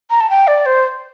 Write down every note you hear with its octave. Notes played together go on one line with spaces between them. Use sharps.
A#5
A5
G5
D5
C5